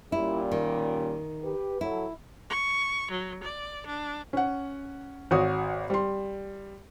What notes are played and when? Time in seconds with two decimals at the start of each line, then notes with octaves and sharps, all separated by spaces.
0.12 A#2 G3 C#4 E4
0.52 D#3
1.43 G4 B4
1.81 F#3 E4 A4
2.50 C#6
3.11 F#3
3.42 D5
3.86 D4
4.33 C#4 F#5
5.31 G#1 F#4 C#5 D#6
5.90 G3 C6